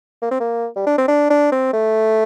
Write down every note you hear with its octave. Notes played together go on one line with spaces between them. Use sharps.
A#3
C4
A#3
G3
D4
C4
D4
D4
C4
A3